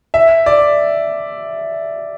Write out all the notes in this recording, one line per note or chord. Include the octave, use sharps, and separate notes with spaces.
E5
D5